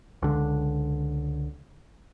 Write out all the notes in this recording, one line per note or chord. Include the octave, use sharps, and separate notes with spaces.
C#2 D3